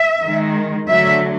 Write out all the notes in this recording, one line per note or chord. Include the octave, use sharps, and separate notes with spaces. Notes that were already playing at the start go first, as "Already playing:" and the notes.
Already playing: E5
D#3 G#3
D3 F#3 A3 E5